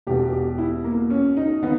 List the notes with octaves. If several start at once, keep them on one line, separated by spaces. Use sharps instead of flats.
E1 E2 B2 G4
G4
E4
A#3
C#4
D#4
D#3 B3